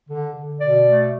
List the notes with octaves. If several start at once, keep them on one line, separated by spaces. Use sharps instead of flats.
D3
D3
B2 D5
A3